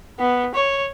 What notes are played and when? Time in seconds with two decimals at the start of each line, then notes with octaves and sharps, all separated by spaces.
0.19 B3
0.55 C#5